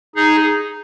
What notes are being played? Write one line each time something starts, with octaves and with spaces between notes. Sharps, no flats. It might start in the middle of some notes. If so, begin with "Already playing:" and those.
D#4 G#4